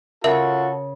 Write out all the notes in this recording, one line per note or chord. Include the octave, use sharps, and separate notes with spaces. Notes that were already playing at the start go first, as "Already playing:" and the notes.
C#3 F4 F#4 A4 A#4 E5